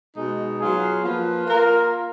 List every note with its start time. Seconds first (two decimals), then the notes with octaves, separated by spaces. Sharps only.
0.16 B2 G#3 D#4
0.60 F#3 B3 F4 G#4
1.03 F3 A#3 F4 B4
1.47 A#3 F4 A#4